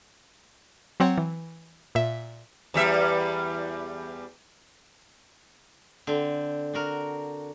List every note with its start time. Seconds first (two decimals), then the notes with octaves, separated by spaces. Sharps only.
1.00 F#3 C4 C#5 F#5
1.18 E3
1.95 A#2 E5
2.74 E2 G3 E5
6.07 D3 C4
6.73 D4 F#4 A#4